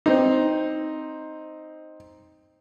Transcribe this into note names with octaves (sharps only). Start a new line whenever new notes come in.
C4 D#4